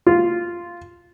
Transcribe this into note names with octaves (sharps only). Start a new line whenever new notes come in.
F4